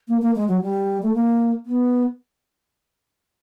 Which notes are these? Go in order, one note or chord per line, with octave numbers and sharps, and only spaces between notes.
A#3
A#3
G#3
F#3
G3
A3
A#3
B3